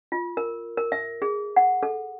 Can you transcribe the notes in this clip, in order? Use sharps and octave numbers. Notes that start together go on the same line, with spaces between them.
F4
A#4
A#4
E5
G#4
F#5
A4